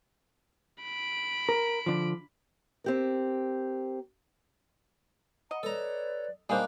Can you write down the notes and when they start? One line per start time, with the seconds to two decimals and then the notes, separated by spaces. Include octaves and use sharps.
0.82 B5 D7
1.49 A#4
1.86 D3 F3
2.84 C4 G4 A#4
5.51 D#5 F#5 A#5 B5
5.63 A4 B4 C#5 D5 A#5
6.49 G3 A#3 D4 D#4 G#4 C5 F#6